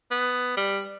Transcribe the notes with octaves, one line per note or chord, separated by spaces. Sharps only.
B3
G3